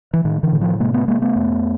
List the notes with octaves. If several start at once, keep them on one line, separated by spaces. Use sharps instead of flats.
E3
A2 D#3
D3 E3
A2
D#3 F3
C3 G#3 A#3
A3 B3
C3 G#3 A#3
A3 B3
F2